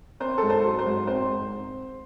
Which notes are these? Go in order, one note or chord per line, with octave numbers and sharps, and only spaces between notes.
C4 C5
G#2 A4
C5
F#3
C5
G#2
C4 C5
G#2